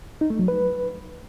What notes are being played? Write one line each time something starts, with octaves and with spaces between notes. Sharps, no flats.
D#4
A3
F#3
B4